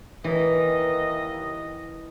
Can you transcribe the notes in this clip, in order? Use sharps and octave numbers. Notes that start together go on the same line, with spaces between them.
D#2 E3 D#5